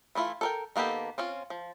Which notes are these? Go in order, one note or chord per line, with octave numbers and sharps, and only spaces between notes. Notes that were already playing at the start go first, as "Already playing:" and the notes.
E3 A3 E4 F4
A4 A#4 G5
D#3 A#3 B3 G4 A4
C4 C#4 F4
F3